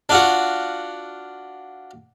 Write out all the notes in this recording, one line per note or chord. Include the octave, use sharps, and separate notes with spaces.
D4 F4 F#4